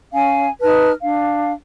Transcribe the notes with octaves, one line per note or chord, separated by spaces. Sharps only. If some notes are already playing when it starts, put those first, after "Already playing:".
C#4 F5 G#5
D#4 B4 A5 F6
D4 F5